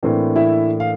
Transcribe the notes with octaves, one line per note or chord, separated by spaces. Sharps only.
A2 E3 A#3 C4 D4 C5
E4 E5
F5